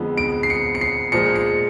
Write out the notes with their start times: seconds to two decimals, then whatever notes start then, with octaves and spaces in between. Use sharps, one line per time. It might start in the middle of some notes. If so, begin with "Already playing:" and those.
Already playing: F2 D3 F3 G#3 B3
0.17 D7
0.43 C7
0.50 C#7
0.75 C#7
0.81 C7
1.12 A#2 F3 G#3 C#7
1.36 C#7